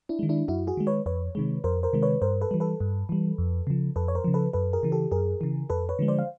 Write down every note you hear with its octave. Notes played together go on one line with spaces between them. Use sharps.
D4 E4
D#3 G#3
D4 E4
F#2 E4 F#4
F#4 G#4
D#3 G#3
B4 C#5
F2 B4 C#5
C3 D#3 G#3
F2 A#4 C5
A#4 C5
C3 D#3 G#3
B4 C#5
G2 A#4 C5
A4 B4
E3 G3
A4 B4
G2
E3 G3
F2
C#3 F3
F2 A4 B4
C#5
A#4 C5
C#3 F3
A4 B4
F#2 A4 B4
G#4 A#4
C#3 E3
G4 A4
F#2 G#4 A#4
C#3 E3
F2 A4 B4
B4 C#5
D3 F3 G#3
C5 D5
F5